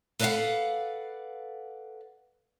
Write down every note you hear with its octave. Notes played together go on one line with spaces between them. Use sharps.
A4 B4 D5 D#5 F5 F#5